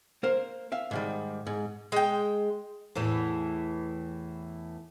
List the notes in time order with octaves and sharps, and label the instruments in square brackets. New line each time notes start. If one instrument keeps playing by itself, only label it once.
[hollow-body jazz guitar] A#3 A#4 C5
E5 F5
G#2 D#3 G3
G#2
[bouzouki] G#3 G5
[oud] E2 A2 E3